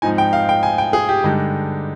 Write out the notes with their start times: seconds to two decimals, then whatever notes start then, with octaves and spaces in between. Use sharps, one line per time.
0.02 G#2 F3 C4 D#4 G#5
0.18 G5
0.33 F5
0.49 G5
0.63 G#5
0.78 G5
0.93 G#4
1.09 G4
1.24 G2 D3 G#3 D#4